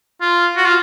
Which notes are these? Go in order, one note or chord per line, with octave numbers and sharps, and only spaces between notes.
F4
F#4
F4